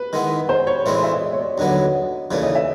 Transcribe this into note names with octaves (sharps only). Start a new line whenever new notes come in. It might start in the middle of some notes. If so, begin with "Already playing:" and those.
Already playing: B4
D#3 G#3 B3 E4
C5
C#5
A2 E3 G#3 C4 E4 D5
D#5
E5
D#5
D5
C#5
D5
D#2 D3 F#3 B3 D#5
D#5
D#2 C#3 E3 A3 D5
D#5
E5